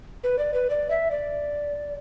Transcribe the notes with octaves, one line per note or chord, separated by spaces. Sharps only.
B4
D5
B4
D5
E5
D5